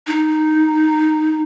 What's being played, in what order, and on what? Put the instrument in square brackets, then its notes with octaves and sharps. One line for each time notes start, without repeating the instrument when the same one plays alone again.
[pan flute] D#4